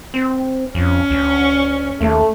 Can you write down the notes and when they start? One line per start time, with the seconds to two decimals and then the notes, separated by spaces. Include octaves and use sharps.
0.14 C4
0.75 F2 C#4
1.11 D2
2.01 D#2 A3